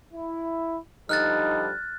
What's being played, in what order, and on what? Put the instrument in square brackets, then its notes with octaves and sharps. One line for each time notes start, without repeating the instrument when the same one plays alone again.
[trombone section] E4
[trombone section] D3 F3 G3 [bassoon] D#4 [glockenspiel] F6 F#6 A6